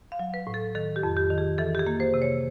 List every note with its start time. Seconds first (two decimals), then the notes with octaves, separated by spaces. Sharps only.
0.12 F5
0.19 F#3
0.34 B4
0.47 A2
0.54 A4
0.75 D#3 A4
0.96 G4
1.03 F2
1.17 G4
1.30 D#3
1.38 G#4
1.58 E3 A4
1.75 G4
1.79 G#4
1.86 A#3
2.00 C5
2.14 C3
2.22 C#5